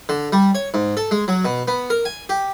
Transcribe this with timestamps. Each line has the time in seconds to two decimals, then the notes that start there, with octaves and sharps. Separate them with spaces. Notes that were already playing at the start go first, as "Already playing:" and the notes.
0.09 D3
0.33 G3
0.55 C#5
0.74 G#2
0.97 A4
1.11 G#3
1.28 F#3
1.45 B2
1.68 B3
1.90 A#4
2.05 G#5
2.29 G4